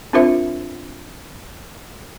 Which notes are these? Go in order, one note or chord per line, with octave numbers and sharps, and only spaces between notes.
C4 D4 F4 A#4 C5 E5